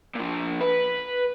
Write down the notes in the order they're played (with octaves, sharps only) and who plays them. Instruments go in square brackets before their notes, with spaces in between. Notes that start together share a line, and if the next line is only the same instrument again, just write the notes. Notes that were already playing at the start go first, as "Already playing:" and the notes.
[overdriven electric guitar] A#2 F3
B4